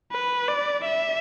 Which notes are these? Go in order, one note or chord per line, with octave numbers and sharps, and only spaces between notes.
B4
D5
E5